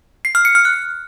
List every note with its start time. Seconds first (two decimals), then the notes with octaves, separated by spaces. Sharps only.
0.25 C7
0.35 F6
0.45 C#7
0.55 F6
0.65 F#6